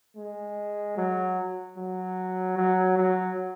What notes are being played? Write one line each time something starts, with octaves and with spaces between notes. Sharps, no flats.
G#3
F#3
F#3
F#3
F#3